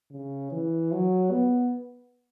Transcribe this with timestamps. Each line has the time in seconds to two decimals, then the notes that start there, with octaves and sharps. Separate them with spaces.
0.11 C#3
0.52 E3
0.92 F#3
1.31 B3